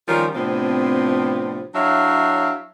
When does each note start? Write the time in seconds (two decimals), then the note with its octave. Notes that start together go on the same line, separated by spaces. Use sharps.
0.08 D#3 F3 G3 C#4 F4 A#4
0.35 A2 C3 F3 B3 C4 D4
1.75 F#3 D4 E4 C#5 E5 F5